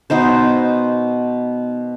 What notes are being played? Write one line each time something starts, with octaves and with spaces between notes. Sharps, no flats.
B2 B3 D#4 C5